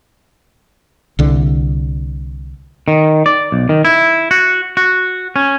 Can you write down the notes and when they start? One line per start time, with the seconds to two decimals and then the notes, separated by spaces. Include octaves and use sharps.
1.19 C2 D3
2.88 D#3
3.26 D5
3.52 B1
3.69 D#3
3.85 E4
4.31 F#4
4.77 F#4
5.36 C#4